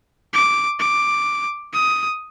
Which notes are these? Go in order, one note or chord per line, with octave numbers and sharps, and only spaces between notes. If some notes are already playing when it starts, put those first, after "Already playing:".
D6
D6
D#6